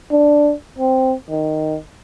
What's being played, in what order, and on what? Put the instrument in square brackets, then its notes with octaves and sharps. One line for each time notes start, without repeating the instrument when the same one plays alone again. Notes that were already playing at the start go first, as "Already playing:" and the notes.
[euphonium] D4
C4
D#3